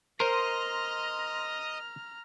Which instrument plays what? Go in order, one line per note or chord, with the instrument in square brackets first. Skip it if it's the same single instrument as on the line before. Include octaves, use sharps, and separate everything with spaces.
[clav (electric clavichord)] A#4 C5 [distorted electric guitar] D#5 [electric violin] A#5 F6 [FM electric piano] C6